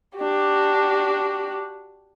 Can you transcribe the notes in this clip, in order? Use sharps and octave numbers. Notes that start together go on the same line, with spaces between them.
D4 F#4 G4